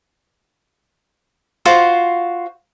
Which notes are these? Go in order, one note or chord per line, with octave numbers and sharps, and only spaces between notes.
F4 F#4 C5